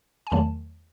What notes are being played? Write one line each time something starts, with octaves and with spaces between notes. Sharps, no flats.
G#5
E2 D#3 F#3 A3 A5